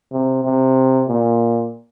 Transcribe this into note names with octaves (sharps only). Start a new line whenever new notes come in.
C3
C3
A#2